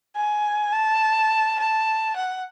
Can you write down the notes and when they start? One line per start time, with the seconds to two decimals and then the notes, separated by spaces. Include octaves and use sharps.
0.16 G#5
0.73 A5
1.59 A5
2.16 F#5